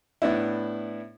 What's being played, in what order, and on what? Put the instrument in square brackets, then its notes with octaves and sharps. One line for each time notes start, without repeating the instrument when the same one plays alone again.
[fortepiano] A2 B3 D4 E4